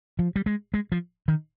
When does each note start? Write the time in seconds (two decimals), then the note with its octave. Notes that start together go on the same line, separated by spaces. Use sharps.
0.19 F3
0.36 G3
0.46 G#3
0.74 G#3
0.92 F3
1.28 D#3